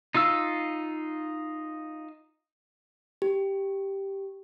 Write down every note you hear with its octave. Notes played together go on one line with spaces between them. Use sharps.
D#4 F4 F5 E6
G4